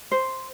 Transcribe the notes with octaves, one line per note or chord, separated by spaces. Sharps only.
C5